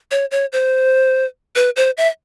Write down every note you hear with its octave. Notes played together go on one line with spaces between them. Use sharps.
C#5
C#5
C5
B4
C5
E5